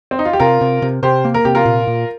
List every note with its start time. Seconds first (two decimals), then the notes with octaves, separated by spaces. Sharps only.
0.11 C4
0.19 D#4
0.25 F4
0.33 G4
0.39 C3 F4 A#4
0.61 C3
0.82 C3
1.03 C3 G4 C5
1.25 A#3
1.34 A#4
1.45 C3 G4
1.55 F4 A#4
1.66 A#2
1.87 A#2